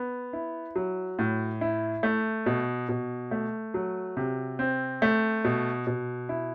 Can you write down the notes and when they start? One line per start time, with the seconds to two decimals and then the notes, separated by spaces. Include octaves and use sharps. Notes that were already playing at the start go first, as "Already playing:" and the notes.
Already playing: B3
0.33 E4
0.76 F#3
1.19 A2
1.61 E4
2.03 A3
2.46 B2
2.89 B2
3.31 A3
3.74 F#3
4.17 C3
4.59 C4
5.02 A3
5.44 B2
5.87 B2
6.29 E4